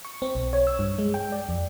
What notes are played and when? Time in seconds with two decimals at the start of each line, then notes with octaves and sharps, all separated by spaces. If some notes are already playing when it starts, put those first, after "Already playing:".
0.05 C#6
0.22 C4
0.35 B1
0.53 C#5
0.67 E6
0.79 G2
0.99 G#3
1.14 G5
1.32 D5
1.49 F2